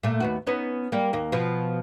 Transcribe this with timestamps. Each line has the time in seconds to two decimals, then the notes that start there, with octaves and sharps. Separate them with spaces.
0.03 A#2 A3
0.20 D#2 B3 F#4
0.47 B3 C#4 D#4
0.92 G3 A#3
1.13 D#2 A#3
1.32 B2 F3